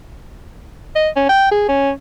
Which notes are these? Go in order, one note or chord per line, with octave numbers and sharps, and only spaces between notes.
D#5
C#4
G5
G#4
C#4